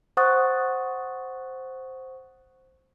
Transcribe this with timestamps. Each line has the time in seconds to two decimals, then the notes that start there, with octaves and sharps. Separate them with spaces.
0.17 C5 F#5 C#6 D#6 F#6 A6